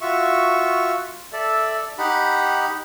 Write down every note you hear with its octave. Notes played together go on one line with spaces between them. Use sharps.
F4 F#4 E5 C#6
A4 D5 E5
D#4 G4 F#5 B5